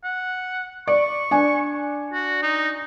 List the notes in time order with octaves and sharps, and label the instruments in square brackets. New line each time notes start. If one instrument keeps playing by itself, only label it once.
[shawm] F#5
[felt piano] D5 [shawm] C#6
[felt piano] D4 G#5
[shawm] F#4
D#4